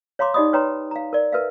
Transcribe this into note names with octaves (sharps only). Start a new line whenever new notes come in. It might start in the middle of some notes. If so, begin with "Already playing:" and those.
C#5 F5 A#5 C6 D6
D#4 G4 D5 D#5 B5 D#6
B4 C#5 G5 A#5 C6
F5 A#5
A#4 D5
A#4 B4 E5 F5